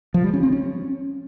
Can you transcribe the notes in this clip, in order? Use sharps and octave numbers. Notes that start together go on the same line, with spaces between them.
F3
G3
C#4
C4
C#4